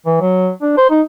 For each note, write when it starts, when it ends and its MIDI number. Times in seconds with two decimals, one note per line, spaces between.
0.06 0.16 52
0.21 0.50 54
0.62 0.77 62
0.77 0.88 72
0.90 1.01 63